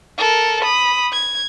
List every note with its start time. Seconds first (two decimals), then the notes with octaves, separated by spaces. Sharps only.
0.18 A4 A#4
0.63 B5 D#6
1.13 G#6